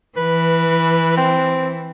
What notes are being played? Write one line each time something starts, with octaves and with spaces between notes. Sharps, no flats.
E3 B4
C4